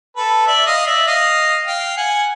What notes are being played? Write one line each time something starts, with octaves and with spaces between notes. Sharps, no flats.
A4 B4
D5 E5
D#5 F5
D5 E5
D#5 F5
F5 G5
F#5 G#5